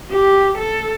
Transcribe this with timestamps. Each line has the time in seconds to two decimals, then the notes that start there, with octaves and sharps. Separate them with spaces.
0.11 G4
0.58 A4